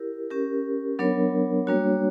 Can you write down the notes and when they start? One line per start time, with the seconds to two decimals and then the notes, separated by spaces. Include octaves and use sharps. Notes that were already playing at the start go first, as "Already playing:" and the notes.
Already playing: E4 G4 A#4
0.31 C#4 G4 A#4
0.99 F#3 B3 D4 A#4 C#5
1.67 G3 A#3 D4 F#4 C#5